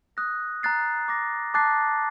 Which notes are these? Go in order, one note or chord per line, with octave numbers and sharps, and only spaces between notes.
D#6 F#6 A#6
A#5 F#6 A6 C7
D6 F#6 A#6
A5 D6 F#6 A6 C7